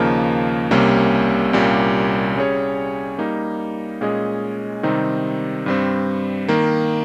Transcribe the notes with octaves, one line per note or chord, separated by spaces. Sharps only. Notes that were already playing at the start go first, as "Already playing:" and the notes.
Already playing: D#2 C#3 F3 A#3 D#4
C2 C3 G3 A#3 C#4
C2 A#2 G3 A#3 C#4
G3 C#4 G#4 C#5
G3 A#3 D#4
A#2 G#3 C#4 G#4 D#5
C3 D#3 G3 C4 D#4
G2 G3 C4
D#3 A#3